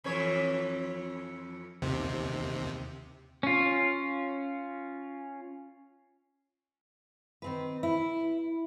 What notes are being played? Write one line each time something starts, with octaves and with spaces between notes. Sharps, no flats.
F2 E3 C#5
D#2 C3
C#4 F4
D#3 C4 B4
E4